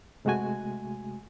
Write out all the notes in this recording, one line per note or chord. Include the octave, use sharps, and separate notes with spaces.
C3 G#3 A3 F#4 G#5